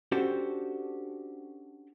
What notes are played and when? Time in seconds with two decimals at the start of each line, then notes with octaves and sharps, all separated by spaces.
0.12 C#4 D4 F#4 G4 A4 C5